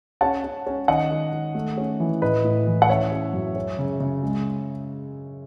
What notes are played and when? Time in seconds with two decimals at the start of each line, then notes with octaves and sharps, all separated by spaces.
0.21 C#4 F#5 A5
0.44 C#4
0.67 C#4
0.88 D#3 D#5 F#5
1.11 D#3
1.32 D#3
1.55 A3
1.78 C#4
2.00 E3
2.22 A2 B4 D#5
2.44 A2
2.67 E3
2.82 F#5
2.89 C#4 C#5 E5
3.12 C#4
3.33 F#2
3.56 C#4
3.79 C#3
4.00 C#3
4.23 G#3